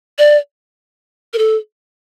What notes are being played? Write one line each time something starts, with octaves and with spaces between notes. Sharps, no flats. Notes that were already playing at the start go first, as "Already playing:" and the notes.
D5
A#4
A4